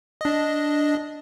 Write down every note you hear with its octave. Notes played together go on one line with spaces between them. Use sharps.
D4 D#5